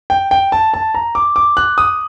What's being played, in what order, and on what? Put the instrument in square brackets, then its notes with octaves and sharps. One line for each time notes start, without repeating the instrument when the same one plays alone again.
[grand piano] G5
G5
A5
A5
A#5
D6
D6
F#6
D#6